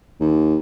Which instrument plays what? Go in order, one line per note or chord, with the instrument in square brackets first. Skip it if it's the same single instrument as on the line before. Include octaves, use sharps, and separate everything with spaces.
[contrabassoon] D#2